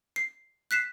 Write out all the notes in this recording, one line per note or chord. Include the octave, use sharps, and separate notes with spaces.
C7
F#6 B6 C7 E7